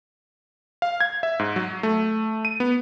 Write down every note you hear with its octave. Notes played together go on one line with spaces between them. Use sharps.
F5
G#6
E5
G#2
F#3
A3
D#7
B3